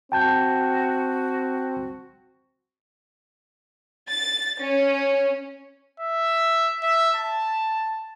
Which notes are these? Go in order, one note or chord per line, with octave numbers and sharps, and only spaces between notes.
C4 F#4 G5 A5 G6
A6
C#4
E5
E5
A5